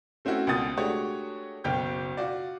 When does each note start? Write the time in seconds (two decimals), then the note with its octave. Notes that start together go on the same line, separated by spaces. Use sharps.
0.25 A3 C4 C#4 E4 F#4
0.47 C#2 B2 C4 F#5 D#6 A6
0.77 G#3 A3 D4 F#4 G4 C#5
1.64 F#1 B1 G5 F6 G6
2.17 F4 F#4 D5